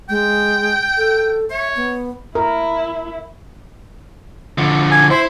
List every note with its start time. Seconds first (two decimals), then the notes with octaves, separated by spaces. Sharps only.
0.09 G#3 G5
0.97 A4
1.50 C#5 E5
1.77 B3
2.35 E4 A#4
4.58 D3 F3
4.91 G#5
5.10 E4 C5